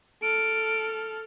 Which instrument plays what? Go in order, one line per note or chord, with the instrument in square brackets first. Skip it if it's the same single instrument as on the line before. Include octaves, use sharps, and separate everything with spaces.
[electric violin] A4 F6 [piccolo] D7